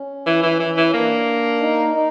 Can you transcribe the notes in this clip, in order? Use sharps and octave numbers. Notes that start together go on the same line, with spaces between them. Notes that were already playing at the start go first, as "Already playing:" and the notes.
Already playing: C#4
E3
E3
E3
E3
C#4
A#3 D4
D#4
D#4